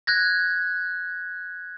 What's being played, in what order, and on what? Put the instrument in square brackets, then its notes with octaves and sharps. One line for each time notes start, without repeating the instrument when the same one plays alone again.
[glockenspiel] F#6 G#6 A#6